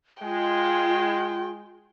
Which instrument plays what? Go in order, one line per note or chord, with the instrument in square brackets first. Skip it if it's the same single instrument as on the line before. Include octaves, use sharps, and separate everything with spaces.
[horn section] G#3 [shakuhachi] F4 [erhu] G5